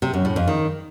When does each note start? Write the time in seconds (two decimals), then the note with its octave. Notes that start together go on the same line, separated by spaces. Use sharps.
0.02 C3
0.13 F#2
0.25 A2
0.36 F2
0.47 D#3